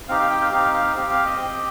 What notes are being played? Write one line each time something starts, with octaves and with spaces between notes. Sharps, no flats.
C4 D#4 G4 F5
F5
G5
F5
C4 D#4 G4 F5
F5
C4 G4 F5
F5
D#5
C4 G4